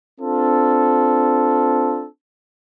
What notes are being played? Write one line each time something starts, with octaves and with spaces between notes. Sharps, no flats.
C4 D4 F4 A4